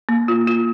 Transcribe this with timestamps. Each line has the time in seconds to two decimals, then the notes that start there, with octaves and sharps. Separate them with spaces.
0.09 A#3
0.28 F4
0.47 F4